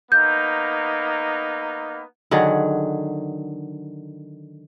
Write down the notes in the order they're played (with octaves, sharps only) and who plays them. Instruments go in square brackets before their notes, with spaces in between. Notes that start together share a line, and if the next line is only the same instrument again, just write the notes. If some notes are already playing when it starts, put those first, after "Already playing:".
[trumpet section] A#3 B3 D#4 [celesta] G6
[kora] D3 D#3 F#3 G#4